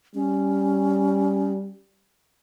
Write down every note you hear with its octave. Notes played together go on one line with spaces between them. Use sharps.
G3 C#4